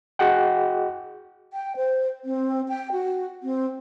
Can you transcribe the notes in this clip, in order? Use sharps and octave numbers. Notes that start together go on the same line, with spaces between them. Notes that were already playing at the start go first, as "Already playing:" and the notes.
F#4 G#4 D#5 F#5 G5
G5
C5
C4
G5
F#4
C4